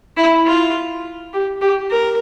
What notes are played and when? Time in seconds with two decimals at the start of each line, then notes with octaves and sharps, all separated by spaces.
0.17 E4
0.46 F4
1.33 G4
1.61 G4
1.91 A#4